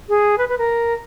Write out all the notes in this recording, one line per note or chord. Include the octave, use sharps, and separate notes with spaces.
G#4
B4
B4
A#4